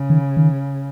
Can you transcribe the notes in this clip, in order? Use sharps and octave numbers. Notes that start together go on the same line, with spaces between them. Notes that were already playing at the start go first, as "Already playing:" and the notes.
Already playing: C#3
D#3
D#3